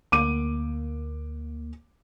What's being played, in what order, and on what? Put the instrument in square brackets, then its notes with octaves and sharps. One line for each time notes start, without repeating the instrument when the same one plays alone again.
[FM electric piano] D2 A#3 [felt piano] D6 D#7